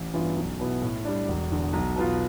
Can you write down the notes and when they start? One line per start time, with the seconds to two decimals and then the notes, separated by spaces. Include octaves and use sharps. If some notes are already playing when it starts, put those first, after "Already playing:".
Already playing: A1
0.14 G2 E3 B3 F4
0.37 B1
0.60 B2 B3 E4
0.82 A2
1.05 G3 D4
1.28 E1
1.51 E2 D3
1.73 B1
1.96 B2 B3 F4